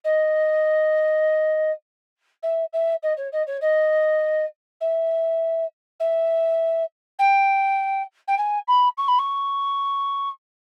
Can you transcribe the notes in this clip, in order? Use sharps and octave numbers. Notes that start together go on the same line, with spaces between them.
D#5
E5
E5
D#5
C#5
D#5
C#5
D#5
E5
E5
G5
G5
G#5
B5
C#6
B5
C#6